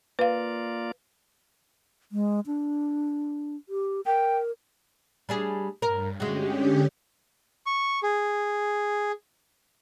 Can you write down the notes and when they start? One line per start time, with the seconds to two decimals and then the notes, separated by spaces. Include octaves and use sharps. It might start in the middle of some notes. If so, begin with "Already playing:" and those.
0.19 A#3 F4 B4 D5 F5
2.12 G#3
2.46 D4
3.69 G4
4.06 A#4 G5
5.29 G3 D4 G#4
5.82 G2 A#4
6.20 D3 G#3 C#4 F#4 G4
7.66 C#6
8.03 G#4